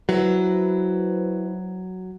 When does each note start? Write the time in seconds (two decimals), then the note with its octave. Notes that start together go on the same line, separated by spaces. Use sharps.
0.09 F#3 E4 B4 C5